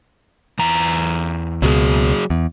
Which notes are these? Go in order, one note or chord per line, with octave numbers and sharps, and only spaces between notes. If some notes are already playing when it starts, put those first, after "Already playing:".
E2 A#5
C#2 B2 F#3 G#4
E2